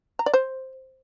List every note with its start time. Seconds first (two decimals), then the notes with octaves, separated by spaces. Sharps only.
0.19 A#5
0.26 D5
0.34 C5